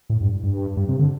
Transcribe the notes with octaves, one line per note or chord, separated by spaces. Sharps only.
A2
G2
G2
G2
C3
D3